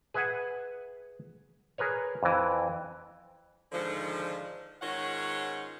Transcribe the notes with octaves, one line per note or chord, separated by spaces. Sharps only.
G#4 B4 E5 F#5 G#5
G#4 A#4 B4 C#5
F2 E3
G#2 D3 D#3 F3
G#2 D#3 C#4 F4 C#5 F#5